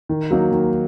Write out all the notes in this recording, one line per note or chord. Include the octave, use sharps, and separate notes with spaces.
D#3
F#3 A#3 D#4
D#3